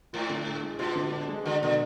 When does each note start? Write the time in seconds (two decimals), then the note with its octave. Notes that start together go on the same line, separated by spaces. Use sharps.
0.13 G#2 F4
0.30 D3
0.46 D4
0.64 G#3
0.79 B2 F4
0.96 D3
1.12 D4
1.29 G#3
1.45 D3 F#4
1.62 B2 D3